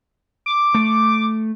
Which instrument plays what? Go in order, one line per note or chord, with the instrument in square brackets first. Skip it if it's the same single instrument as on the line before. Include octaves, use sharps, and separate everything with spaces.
[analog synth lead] D6
[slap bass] A3